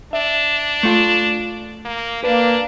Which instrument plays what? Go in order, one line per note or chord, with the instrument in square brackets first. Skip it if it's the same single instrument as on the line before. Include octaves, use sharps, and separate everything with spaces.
[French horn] D4 [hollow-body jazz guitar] E5
[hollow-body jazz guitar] A3 F4
[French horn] A#3
[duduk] A#3 [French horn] D4 [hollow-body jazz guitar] B4